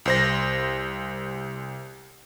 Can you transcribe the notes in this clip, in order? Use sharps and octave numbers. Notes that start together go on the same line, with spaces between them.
C2 C5 A#6